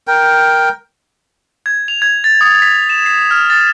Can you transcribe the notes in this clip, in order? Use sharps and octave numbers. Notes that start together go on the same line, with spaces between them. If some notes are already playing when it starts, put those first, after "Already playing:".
A#4 G5
G#6
F7
G#6
A6
D#6
B6
E7
C7
F6
A6